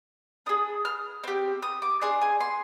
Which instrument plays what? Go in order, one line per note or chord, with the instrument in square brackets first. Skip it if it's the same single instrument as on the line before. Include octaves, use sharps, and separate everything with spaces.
[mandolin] D4 G#4 D#6
F6
C4 G4
D#6
D6
D4 G#4 C6
G#5
C6